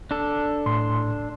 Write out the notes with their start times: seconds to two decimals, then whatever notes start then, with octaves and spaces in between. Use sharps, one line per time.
0.11 D4 A4
0.66 A2 C6